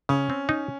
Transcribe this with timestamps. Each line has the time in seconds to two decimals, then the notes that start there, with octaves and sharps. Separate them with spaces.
0.09 C#3 C#4
0.30 C4
0.49 D#4